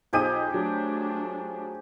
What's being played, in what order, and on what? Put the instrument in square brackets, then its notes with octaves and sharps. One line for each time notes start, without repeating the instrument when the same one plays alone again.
[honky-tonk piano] B1 D#4 D#7 [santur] F3 G4 G#4
[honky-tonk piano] F#3 [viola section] A3 D4